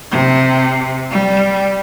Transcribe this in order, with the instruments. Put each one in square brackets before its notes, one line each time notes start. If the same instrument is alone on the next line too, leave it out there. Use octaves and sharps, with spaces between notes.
[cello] C3
G3